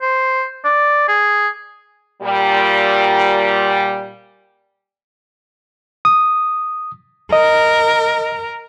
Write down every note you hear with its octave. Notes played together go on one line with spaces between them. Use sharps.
C5
D5
G#4
A#2 G3
D#6
A#4 D#5